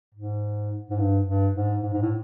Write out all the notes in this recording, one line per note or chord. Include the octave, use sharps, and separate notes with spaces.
G#2
G#2
G2
G2
G#2
G#2
G#2
A2